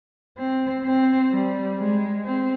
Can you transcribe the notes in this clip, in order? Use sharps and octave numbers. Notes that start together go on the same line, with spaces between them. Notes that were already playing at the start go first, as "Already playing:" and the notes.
C4
C4
G3
G#3
C4